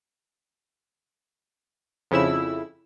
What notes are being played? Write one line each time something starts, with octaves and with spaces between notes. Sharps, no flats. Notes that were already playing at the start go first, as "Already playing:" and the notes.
F2 C#3 E4 E6